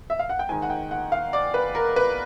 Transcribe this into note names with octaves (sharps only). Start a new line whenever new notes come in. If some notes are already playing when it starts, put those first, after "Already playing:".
E5
F5
F#5
G5
G#2 D#3 G#5
F#5
G5
F#5
F5
D5
B4
A#4
B4